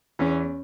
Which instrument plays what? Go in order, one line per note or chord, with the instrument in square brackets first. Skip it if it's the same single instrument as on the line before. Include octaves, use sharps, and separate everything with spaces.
[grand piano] E2 E3 [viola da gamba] C#4